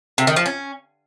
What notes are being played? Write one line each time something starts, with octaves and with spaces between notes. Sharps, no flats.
C3
D#3
F3
C#4